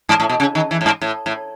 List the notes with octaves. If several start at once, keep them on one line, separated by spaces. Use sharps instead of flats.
G#2
A2
B2
C#3
D#3
E3
A2
G#2
A2
A2